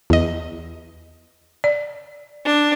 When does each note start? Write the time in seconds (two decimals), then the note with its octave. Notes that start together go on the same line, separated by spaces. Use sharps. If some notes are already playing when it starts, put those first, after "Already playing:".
0.10 E2 D#5
1.64 D5
2.43 D4